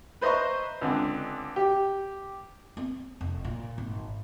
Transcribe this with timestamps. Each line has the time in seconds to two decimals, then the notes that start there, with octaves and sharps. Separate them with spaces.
0.21 B4 C5 D#5 E5 A#5 C#6
0.81 C#2 D3 C4
1.56 G4
2.77 C4 C#4
3.21 F1
3.45 A#2
3.78 G#1